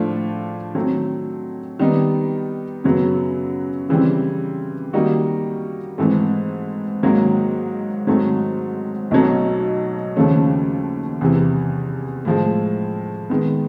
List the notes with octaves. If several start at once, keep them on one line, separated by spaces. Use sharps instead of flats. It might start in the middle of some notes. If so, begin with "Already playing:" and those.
Already playing: A2 F3 A3 D4 F4
D#3 F#3 A3 C4
D#3 G3 B3 D#4
F#2 C#3 F#3 B3
C#3 E3 G3 C4
D#3 G3 A#3 D#4 F#4
G#2 E3 A3 C4
G#2 D#3 F#3 A#3
G#2 D#3 F#3 A3 C4
B1 B2 F#3 A3
D#2 C#3 F3 A3 C#4
E2 C3 E3
A2 F3 G#3
D#3 G#3 B3